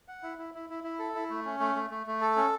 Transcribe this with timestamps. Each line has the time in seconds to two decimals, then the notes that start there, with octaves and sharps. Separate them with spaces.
0.08 F#5
0.23 E4
0.39 E4
0.54 E4
0.70 E4
0.84 E4
0.99 A4
1.15 E4
1.30 A3
1.46 C#4
1.60 A3
1.75 A3
1.90 A3
2.07 A3
2.21 A4
2.36 C#4